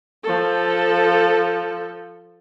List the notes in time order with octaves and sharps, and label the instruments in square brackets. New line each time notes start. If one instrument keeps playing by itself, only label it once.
[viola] F3 A4